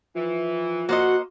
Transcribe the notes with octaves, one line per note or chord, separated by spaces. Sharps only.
E3 F3
A#3 F#4 C5 D#5 F#5